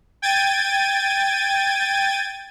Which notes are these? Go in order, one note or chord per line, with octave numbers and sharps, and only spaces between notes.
G5 G#6 A6 D#7